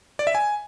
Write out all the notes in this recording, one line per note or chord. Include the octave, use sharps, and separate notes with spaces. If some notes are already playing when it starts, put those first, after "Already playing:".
D5
E5
G#5